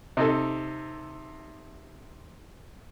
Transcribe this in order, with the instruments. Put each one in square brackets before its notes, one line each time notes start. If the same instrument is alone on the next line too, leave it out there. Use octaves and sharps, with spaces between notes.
[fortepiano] C3 D#4 A4